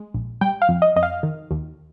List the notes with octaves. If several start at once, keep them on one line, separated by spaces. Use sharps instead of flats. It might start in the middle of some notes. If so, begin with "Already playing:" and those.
Already playing: G#3
A#1
G3 G5
F5
F2
D#5
F2 D#5
F5
D#3
D#2